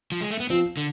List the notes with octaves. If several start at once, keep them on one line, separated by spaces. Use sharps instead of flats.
F3
G#3
A3
B3
F3 C4
D3